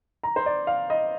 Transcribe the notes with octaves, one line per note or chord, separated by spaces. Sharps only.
A#5
C5
D5
F5
D#5